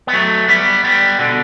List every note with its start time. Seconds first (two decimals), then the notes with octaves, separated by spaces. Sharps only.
0.07 B3
0.13 F#3 A3
0.48 G3 B3
0.84 G3 B3
1.19 B2 D3